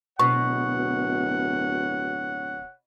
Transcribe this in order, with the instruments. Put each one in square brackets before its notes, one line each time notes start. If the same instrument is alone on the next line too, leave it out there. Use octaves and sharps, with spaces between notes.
[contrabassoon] D1 [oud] B2 [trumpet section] C#5 F#5 [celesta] C#6